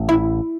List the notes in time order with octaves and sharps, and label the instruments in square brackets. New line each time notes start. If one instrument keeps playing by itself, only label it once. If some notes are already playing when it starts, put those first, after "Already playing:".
Already playing: [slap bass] A1 A2
[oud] E4